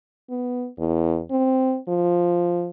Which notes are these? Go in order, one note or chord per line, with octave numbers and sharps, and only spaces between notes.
B3
E2
C4
F3